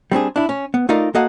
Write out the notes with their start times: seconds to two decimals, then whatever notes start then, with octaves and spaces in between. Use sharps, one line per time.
0.12 G3 C4 D4 G#4
0.36 D4 E4
0.49 C#4
0.74 B3
0.89 A3 D#4 F4 A#4 D5 D#5
1.15 A#3 F#4 A4 D#5 F5 F#5